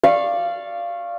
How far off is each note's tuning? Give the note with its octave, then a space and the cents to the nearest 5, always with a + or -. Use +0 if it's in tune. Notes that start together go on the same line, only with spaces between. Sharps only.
D5 +0 F5 -15 C#6 -25